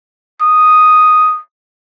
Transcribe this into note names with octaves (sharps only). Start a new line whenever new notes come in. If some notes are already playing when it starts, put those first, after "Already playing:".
D#6